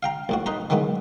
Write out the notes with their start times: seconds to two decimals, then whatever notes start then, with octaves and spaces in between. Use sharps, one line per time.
0.03 F5 G5 A#5
0.29 A#1 A2 F#4
0.46 D#4 B4 C5 A#5
0.70 D#3 E3 F#3 G#3 B3